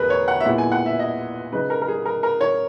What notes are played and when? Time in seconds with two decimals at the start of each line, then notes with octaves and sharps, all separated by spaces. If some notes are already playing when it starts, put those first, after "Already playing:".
Already playing: E2 B2 G#4 A#4 B4
0.10 C#5
0.28 F#5
0.40 E5
0.45 A#2 G#3 B3 E4 F#5
0.58 G#5
0.72 F#5
0.86 E5
0.99 D#5
1.52 C#3 G#3 D#4 B4
1.70 A#4
1.82 A#4
1.88 G#4
2.06 A#4
2.23 A#4
2.41 C#5